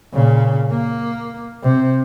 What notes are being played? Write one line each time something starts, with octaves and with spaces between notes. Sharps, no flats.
A#2 C#3
A#3
C3